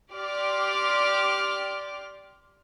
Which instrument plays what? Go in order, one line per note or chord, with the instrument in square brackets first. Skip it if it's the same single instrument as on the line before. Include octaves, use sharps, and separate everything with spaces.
[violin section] G4 D5 C6 D6 F6